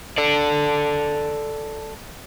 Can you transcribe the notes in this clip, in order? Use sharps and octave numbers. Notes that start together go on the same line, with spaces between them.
A4 D5